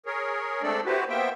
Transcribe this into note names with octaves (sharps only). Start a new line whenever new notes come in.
G#4 A#4 C#5
G#3 A3 C4 D4 A4 D5
E4 F#4 G4 B4 C5
A#3 B3 C5 E5 G5